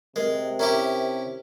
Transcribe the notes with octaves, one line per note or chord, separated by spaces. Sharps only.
C3 G#3 A#4 B4
C#4 E4 G4 A#4 A#5